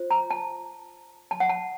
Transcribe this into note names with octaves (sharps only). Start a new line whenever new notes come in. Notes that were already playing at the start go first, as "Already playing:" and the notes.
Already playing: F4 C5
A#5
A5
A5
F#5
A5